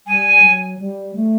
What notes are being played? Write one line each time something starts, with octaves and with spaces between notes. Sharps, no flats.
G3 G#5
F#3
G3
A3